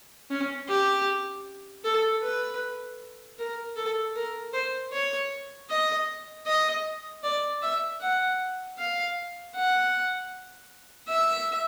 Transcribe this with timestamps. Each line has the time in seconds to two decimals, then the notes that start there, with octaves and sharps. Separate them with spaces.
0.30 C#4
0.68 G4
1.84 A4
2.22 B4
3.39 A#4
3.76 A4
4.16 A#4
4.53 C5
4.93 C#5
5.70 D#5
6.47 D#5
7.23 D5
7.62 E5
8.01 F#5
8.78 F5
9.55 F#5
11.08 E5